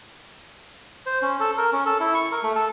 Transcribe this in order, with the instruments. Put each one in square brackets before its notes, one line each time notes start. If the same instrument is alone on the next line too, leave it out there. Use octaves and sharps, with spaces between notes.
[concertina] C5
C#4
A4
A#4
C#4
A4
E4
C#6
A#4
A3
A4